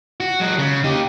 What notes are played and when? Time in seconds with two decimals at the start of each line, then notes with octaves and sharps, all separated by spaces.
0.20 F#4
0.40 F#3 G#3
0.59 C#3
0.84 D#4 G4